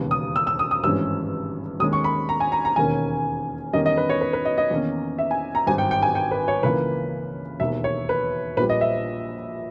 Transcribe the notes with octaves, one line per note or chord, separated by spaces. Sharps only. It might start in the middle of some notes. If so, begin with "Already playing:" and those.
Already playing: E1 D#2 C#3 G3 B3
D#6
E6
E6
D#6
D#6
G#1 G2 E3 G#3 C#4 E6
D#2 D#3 G#3 C#4 D#6
C#6
B5
A#5
G#5
A#5
A#5
E1 D#2 D#3 A#3 C#4 G#5
E2 D#3 G3 C#4 D#5
D#5
B4
C#5
B4
B4
D#5
D#5
E2 D#3 A#3 C#4
E5
G#5
A#5
G#1 G2 G3 G#5
G5
G5
G#5
G5
B4
C#5
C#2 C#3 E3 A#3 B4
E1 D#2 D#3 E5
C#5
B4
A#1 A#2 G3 B4
D#5
E5